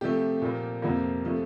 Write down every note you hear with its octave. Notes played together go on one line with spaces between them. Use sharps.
C3 F3 A3 G4
A#2 F3 A#3
F2 C3 F3 A#3
C3 F3 A3